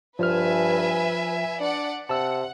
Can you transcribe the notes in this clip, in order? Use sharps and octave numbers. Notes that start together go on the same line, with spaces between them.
G2 F3 B4 E5 G#5 F6
D4 D5 F#5
C3 F#5 A5 E6